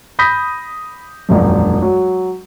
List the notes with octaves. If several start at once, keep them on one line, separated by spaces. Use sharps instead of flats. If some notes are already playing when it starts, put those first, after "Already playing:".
B5 D#6 G6 A#6 B6
E1 A#1 F#2
F#3